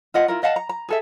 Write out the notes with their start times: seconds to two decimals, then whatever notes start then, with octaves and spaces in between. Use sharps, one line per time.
0.14 F4 D#5 F#5
0.28 E4 F4 A#4
0.43 D#5 F5 F#5 A5
0.56 A#5
0.69 A#5
0.89 G#4 A4 E5